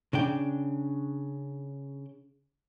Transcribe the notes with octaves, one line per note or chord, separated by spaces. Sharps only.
C#3 D4 G5